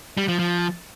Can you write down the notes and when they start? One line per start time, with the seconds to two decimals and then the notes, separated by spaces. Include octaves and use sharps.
0.17 G3
0.28 F3
0.39 F3